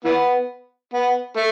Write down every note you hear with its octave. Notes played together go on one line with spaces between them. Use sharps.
E3 B3
B3
A3